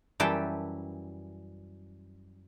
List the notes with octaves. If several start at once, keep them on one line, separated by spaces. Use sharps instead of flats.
F#2 E3 G3 G5 A5